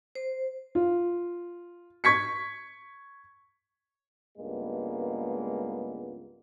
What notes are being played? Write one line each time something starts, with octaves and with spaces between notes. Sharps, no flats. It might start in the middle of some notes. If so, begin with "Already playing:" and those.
C5
F4
C#6 G#6 B6 C#7
C#2 G2 G#3 A#3 B3